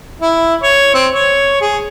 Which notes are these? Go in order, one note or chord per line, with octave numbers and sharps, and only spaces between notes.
E4
C#5
C4
C#5
G#4